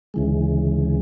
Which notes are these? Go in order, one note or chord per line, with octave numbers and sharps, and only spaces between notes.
D2 C#3 E3 G#3